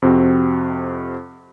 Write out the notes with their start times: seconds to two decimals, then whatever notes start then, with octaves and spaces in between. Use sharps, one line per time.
0.02 F2 C3 C4 F#4